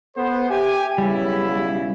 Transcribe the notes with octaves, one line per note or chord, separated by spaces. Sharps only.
B3 A4 C5
G4 E5 G#5
B1 C#3 G3 E4